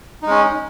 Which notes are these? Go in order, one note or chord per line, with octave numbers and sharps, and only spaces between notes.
G#3 C#4 D#4